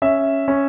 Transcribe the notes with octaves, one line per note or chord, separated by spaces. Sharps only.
C#4 E5
C#4